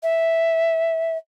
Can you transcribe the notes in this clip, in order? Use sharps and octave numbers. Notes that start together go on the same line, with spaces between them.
E5